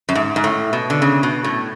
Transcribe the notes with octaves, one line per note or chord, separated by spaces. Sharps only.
F#2
G#2
G#2
A2
B2
D3
C#3
B2
A2